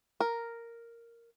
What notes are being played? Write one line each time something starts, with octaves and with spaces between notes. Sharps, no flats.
A#4